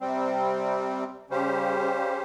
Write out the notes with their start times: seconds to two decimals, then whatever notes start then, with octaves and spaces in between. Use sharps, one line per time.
0.01 C3 G3 C4
1.30 C#3 G3 C#4 G4 C5